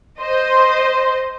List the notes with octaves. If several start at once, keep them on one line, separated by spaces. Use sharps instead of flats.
C5 D#5